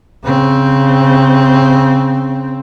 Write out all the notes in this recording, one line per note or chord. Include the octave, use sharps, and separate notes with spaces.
C#3 C4